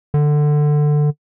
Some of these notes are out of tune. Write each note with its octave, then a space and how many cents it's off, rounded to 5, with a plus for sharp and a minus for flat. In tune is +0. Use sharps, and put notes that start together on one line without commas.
D3 +15